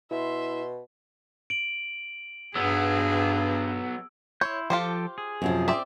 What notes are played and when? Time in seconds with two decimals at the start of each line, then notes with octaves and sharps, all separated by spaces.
0.11 B2 E4 E5 C6
1.50 D7 F#7
2.56 G2 F#3 B3 G#4 E6
4.41 E4 C#5 C6 G6
4.70 F3 F4 G4 A4 C5 G5
5.18 G#4
5.42 F#2 C3 F3
5.68 C4 D5 E5